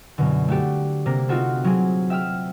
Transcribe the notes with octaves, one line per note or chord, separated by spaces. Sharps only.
F#2 B2 D3
A3 F#4 G4 A4
C3 A#3 A#6
C4 D#4 F4 F#4 A4 C5
F#3 C4 G#4
E5 G5 E6 F6